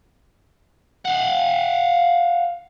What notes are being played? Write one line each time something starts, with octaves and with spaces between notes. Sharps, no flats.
F5 F#5